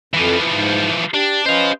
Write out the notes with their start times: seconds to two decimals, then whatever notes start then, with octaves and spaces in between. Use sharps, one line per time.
0.14 F2 E3 F3
0.49 G#2
1.14 D4 G4
1.46 C#4 B4 C5 D#5 F5